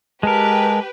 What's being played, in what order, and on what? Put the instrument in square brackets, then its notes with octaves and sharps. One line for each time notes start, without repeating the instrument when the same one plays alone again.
[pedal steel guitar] G#3 A#4 [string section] G4 B4 [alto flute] A5